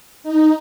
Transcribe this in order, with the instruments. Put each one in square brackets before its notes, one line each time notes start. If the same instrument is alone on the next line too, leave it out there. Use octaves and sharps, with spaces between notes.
[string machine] D#4